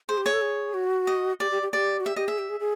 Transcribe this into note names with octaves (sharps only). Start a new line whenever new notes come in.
G#4 C5
G4
G#4 C#5
A4
G#4
F#4
D#5
G4 D5
G4
G4
G4 D5
F#4
G4 E5
G4 D#5
G#4 E5
G4
G#4
G#4